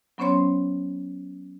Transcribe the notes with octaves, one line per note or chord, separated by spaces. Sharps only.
F#3 B3 C#4 C5 C#5 C6